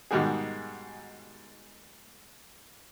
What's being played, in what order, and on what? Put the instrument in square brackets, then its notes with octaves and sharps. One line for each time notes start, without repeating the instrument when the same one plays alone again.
[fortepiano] G#2 B2 D#3 G3 F#4 G#4